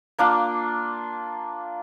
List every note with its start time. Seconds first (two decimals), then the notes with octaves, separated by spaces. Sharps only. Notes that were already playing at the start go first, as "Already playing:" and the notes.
0.18 A#3 D4 F4